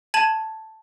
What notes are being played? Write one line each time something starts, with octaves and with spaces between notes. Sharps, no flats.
A5 G#6 D#7 E7 F#7